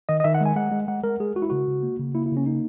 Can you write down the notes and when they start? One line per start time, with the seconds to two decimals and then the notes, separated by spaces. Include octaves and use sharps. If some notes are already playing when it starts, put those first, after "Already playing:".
0.09 D#3 D#5
0.20 D#5
0.24 D#3 E5
0.34 F#5
0.41 G#3 G#5
0.56 G#3 F#5
0.72 G#3
0.88 G#3 F#5
1.03 G#3 A#4
1.20 G#3 G#4
1.35 G#3 F#4
1.42 E4
1.50 C#3 F#4
1.67 C#3
1.83 A#3
1.99 C#3
2.14 A#3 E4
2.26 E4
2.31 C#3
2.37 C#4
2.46 A#3 D#4